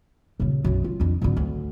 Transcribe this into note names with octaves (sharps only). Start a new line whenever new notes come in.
D#1 C#3
B1 F#2
F4
F2 D4
G#1 D3
D2